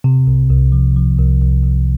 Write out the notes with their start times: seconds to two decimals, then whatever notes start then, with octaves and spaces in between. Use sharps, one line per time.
0.04 C3
0.27 C2
0.50 C2
0.72 F3
0.96 F3
1.18 C2
1.41 C2
1.63 C2